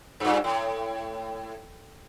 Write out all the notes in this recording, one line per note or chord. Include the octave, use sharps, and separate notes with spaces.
G2 A#2
A2